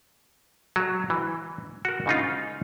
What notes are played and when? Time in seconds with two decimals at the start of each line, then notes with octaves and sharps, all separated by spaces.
0.76 F#3
1.10 E3
1.85 F#4 A#4
2.06 G#2 C#3 D#4 F4